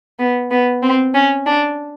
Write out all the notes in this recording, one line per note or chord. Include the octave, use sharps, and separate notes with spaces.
B3
B3
C4
C#4
D4